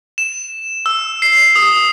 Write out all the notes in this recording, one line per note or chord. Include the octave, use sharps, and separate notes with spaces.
E7
E6
C7
D#6